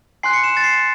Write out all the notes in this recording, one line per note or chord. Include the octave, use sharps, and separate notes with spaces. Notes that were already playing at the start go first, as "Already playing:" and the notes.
G#5 C6 F#6 C7
C#7
E7
A6
C7